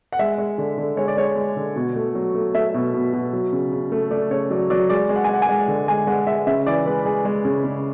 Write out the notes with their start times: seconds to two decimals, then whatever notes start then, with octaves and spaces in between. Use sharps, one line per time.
0.12 F#5
0.19 G#3 E5
0.38 G#3
0.58 D3
0.78 D3
0.97 G#3 C#5
1.08 D5
1.17 G#3 C#5
1.36 G#3
1.56 D3
1.76 B2
1.96 A3
2.15 F#3
2.35 A3
2.54 A3 E5
2.74 B2
2.94 B2
3.13 B2
3.33 F#3
3.53 C#3
3.72 C#3
3.92 A3
4.11 A3 D5
4.30 C#3 C#5
4.50 F#3 D5
4.70 F#3 D5
4.89 G#3 D5
5.09 G#3
5.16 F#5
5.24 G#5
5.29 G#3 F#5
5.42 G#5
5.49 G#3
5.68 D3
5.88 G#3 G#5
6.07 G#3 F#5
6.27 G#3 E5
6.47 C#3 E5
6.66 E3 D5
6.86 G#3 B4
7.05 G#3 G#4
7.25 G#3
7.45 C#3
7.64 C#3